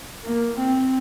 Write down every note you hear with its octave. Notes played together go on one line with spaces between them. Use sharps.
A#3
C4